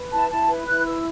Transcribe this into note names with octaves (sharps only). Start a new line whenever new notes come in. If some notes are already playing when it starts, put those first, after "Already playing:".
Already playing: B4
E4 A5
E4 A5
B4
E4 F#6
B4 E6